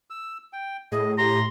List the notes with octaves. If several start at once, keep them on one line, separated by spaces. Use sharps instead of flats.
E6
G5
A2 G#4 D#5
G4 A#5 C6